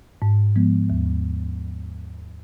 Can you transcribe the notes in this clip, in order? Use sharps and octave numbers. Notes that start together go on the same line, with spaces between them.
G#2
F3 G#3 B3
D#2